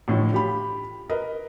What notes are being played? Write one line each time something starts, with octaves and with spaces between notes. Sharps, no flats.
A1 A2 D3 F3
F4 G4 B5
A#4 B4 D#5